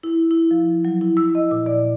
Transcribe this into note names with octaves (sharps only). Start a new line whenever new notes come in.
E4
E4
F3
F#3
E4
E6
D#5
A#2
D5